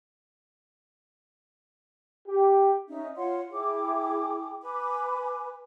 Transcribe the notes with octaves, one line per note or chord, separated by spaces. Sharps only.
G4
C#4 D#4 E5
F4 C#5 F#5 C6
E4 G#4 G5 D6
B4 G#5 D6